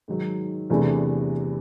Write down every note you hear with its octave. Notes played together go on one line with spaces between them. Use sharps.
G#2 D#3 F#3
E2 C3 E3 A3 D4